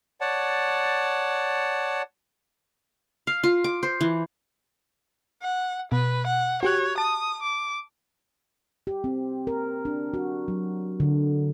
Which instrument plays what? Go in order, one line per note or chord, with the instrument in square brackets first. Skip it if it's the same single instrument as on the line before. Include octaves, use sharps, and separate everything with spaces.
[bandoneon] C#5 D5 F#5 A5
[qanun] F5
F4
D6
C5
E3
[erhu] F#5
[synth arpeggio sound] B2 [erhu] B4
[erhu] F#5
[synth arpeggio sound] F#4 G4 F#6 [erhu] C#5
[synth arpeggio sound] A5 [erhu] D#6
[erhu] D6
[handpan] G4
C4
A#4
D4
F#4
F#3
D3